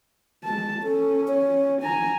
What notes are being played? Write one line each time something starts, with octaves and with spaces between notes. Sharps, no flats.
G#3 A5
C#4 A4
C#5
D4 G#5 A#5